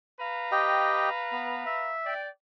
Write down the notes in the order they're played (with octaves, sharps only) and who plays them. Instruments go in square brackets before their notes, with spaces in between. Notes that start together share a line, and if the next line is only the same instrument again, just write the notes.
[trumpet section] B4 F5 A#5
[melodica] G4 D#5 G5
B3
E5
[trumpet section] D5 G5